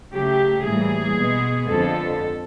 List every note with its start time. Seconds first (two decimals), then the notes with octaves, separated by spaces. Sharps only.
0.13 C#3 F#3 A3 G4
0.65 A2 E3 G3 A#3 G#4
1.17 B2 G#3 B3
1.69 F2 D3 F3 G#3 B3 A4